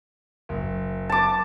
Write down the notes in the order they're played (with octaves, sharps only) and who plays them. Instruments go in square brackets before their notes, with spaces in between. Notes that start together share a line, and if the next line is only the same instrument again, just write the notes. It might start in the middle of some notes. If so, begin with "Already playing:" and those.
[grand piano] F#1
[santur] A5 D6